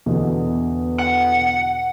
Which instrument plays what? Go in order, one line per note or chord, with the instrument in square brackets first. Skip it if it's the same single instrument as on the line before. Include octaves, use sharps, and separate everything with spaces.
[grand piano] E2 B2 D3
[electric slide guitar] F#5